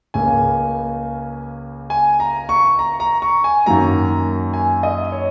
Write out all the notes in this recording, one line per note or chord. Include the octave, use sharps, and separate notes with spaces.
C#2 C#3 A#3 G#5
G#5
A#5
C#6
A#5
A#5
C#6
G#5
F#2 D#3 F#3 A#3 A#5
G#5
D#5
C#5